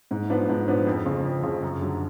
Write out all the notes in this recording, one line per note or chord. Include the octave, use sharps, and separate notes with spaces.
G#2
F3 B3 D4
G#2
F3 B3 D4
F2
C#3 F3
F2
C#3 F3
F#2
D3 F#3